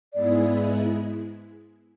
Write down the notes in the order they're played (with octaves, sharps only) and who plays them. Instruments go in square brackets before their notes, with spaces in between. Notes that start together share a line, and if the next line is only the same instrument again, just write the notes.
[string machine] G#2 G#3 B3 E4 G#4 [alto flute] D5